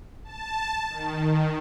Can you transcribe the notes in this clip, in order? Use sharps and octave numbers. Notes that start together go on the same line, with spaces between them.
A5
D#3